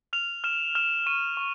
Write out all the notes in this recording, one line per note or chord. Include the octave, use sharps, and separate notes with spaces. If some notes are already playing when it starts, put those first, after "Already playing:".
F6 F7
F6 E7
F6 E7
C#6 D#7
C#6